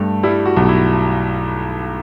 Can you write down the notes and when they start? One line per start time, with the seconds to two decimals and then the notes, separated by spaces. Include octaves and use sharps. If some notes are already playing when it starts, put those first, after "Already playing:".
Already playing: G2 A3
0.23 G3 E4
0.45 F#4
0.56 B1
0.69 E4